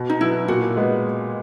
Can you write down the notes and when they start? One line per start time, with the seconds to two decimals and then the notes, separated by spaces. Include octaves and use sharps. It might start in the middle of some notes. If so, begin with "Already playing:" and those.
Already playing: B2
0.10 D#4
0.21 F#3 B3 E4
0.48 A#2 F#4
0.77 G#3 B3